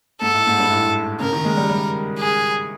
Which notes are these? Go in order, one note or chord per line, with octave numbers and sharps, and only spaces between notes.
G#2 A4
A2
G#2
G2
A2
C#3 A#4
D#3
G#3
G3
G3
G#4